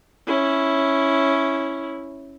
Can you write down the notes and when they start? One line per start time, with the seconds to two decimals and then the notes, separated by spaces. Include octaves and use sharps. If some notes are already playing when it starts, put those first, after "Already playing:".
0.27 C#4 E4